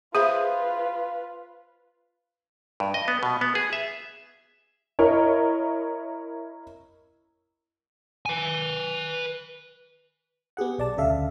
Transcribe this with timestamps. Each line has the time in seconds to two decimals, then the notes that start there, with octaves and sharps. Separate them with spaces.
0.15 F4 G#4 B4 C5 E5 B5
2.80 G2
2.94 D#5
3.08 B3
3.23 B2
3.41 B3
3.55 G#4
3.73 E5
4.99 E4 A#4 C#5 D#5
8.26 B4 G#5
10.57 B3 G4 G#4 F#5
10.78 B1 D5 A5
10.97 D2 C#3 A4 E5 F5